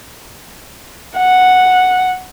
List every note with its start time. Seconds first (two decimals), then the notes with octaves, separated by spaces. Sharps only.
1.17 F#5